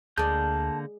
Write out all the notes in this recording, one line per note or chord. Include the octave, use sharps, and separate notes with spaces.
D2 D3 G#3 A#3 D5 A5 G6